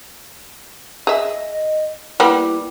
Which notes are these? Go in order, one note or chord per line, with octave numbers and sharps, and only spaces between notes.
G#4 D#5 E5
G3 A#3 B3 E4